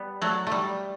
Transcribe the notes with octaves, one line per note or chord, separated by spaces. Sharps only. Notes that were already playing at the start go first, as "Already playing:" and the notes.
Already playing: G3 B3
F#3 A3
G3 A3